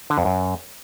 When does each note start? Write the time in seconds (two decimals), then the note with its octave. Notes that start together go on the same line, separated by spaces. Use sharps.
0.10 D3
0.18 F2
0.25 F#2